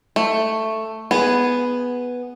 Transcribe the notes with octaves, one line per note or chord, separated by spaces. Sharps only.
A3
B3 G#4